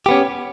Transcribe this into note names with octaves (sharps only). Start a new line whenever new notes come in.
B3 C#4 G4